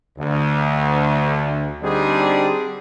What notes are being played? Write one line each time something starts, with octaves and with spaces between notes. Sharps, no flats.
D2
D3 G3 C4 D4 D#4 G#4